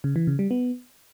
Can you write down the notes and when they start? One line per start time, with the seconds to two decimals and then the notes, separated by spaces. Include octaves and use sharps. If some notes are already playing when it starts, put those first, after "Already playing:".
0.04 C#3
0.16 E3
0.27 C#3
0.39 G3
0.51 B3